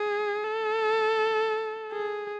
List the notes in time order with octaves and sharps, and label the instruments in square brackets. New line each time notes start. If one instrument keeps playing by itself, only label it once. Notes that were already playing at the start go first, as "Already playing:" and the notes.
Already playing: [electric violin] G#4
A4
G#4